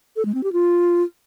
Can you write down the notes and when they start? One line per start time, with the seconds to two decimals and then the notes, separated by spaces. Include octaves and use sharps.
0.16 A4
0.25 G#3
0.34 C4
0.43 G4
0.52 F4